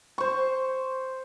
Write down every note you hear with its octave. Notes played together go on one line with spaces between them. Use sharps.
C5 C#6